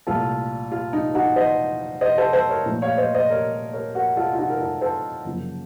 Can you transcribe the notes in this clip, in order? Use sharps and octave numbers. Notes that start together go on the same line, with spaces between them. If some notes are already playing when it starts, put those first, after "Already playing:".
C2 A#2 A3 C4 F4 A4
F4
D#4
D#4 F#4
C5 D#5
C5 D#5
A4 C5
A4 C5
A#4 C#5
A#2 F3 A3
C#5 F5
C5 D#5
C5 D#5
A#4 C#5
A#4 C#5
F#4 A#4
F4 A4
F4
D#4 F#4
A#4
F4 A4
A4 C5
F#2 C#3 F3 A#3